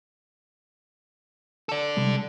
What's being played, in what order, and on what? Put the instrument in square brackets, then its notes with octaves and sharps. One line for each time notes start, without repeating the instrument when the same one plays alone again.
[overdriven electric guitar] A4 D5
[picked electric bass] C3 G3 G#3